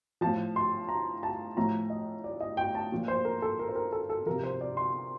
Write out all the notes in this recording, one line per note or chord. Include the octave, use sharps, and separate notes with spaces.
A2 F3 A5
C6
A#5
A5
A2 F3 A#5
D#5
D5
D#5
G5
A5
A#2 F3
C5
A#4
A4
A#4
C5
A#4
A4
A4
C3 F3 A#4
C5
D5
C6